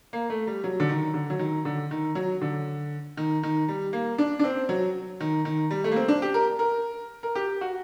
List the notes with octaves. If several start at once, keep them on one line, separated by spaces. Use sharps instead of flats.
A#3
A3
G3
F#3
D3
D#3
D3
F#3
D#3
D3
D#3
F#3
D3
D#3
D#3
G3
A#3
D4
D4
C4
F#3
D#3
D#3
G3
A3
A#3
C4
D4
G4
A#4
A#4
A#4
G4
F#4